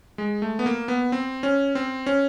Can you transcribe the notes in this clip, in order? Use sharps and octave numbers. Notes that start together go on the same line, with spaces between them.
G#3
A3
B3
A#3
B3
C4
C#4
C4
C#4